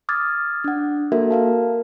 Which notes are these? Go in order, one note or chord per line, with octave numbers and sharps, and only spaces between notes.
D6 D#6 F6 G#6 A6
D4 F#5
A#3 F#4 A4 A#4 E5
A#4 F5 A5